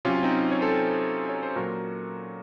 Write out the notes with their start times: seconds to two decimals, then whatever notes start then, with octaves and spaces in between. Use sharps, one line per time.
0.05 C3 F#3 C#4 F4
0.23 C4 D#4
0.51 C#5
0.61 A4 C5
1.29 C#5
1.43 C5
1.56 A#2 F#3 F#4 A#4